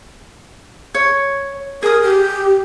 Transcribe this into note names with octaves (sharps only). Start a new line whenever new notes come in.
C#5
G#4 A#4 D#6
G4